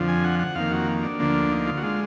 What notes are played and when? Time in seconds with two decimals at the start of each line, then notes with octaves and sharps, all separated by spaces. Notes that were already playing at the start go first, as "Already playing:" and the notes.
Already playing: F2 D3 F3
0.08 G#5
0.24 F#5
0.39 F#5
0.55 F2 D#3 A#3 F5
0.71 F#4
1.03 D4
1.19 D2 D3 F3 A#3
1.52 D#4
1.67 F4
1.77 F#4
1.83 D3 G#3 F4